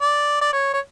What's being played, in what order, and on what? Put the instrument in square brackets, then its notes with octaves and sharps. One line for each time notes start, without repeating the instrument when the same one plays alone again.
[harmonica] D5
D5
C#5
C#5